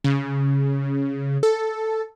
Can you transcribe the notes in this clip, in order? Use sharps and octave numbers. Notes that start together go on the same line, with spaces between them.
C#3
A4